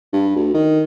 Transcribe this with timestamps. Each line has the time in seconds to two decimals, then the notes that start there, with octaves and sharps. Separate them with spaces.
0.13 G2
0.36 D2
0.54 D#3